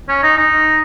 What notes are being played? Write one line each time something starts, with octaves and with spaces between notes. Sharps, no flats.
C#4
D#4
D#4